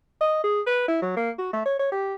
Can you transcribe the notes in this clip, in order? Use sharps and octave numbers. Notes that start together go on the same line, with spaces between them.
D#5
G#4
B4
E4
F#3
A#3
F#4
A3
C#5
C#5
G4